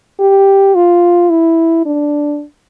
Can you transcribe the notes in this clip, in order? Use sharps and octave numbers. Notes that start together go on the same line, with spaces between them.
G4
F4
E4
D4